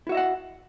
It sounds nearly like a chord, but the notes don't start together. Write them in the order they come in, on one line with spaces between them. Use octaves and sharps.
E4 F#4 E5 D#5 F#5